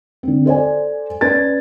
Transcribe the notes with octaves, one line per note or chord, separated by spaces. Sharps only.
D3 C4
A4 C5 D5 G#5
C#4 B4 D5 G#6 A6